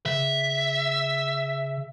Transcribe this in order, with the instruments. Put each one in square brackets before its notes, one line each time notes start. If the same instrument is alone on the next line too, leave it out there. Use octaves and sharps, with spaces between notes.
[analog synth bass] C#3 [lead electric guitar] E5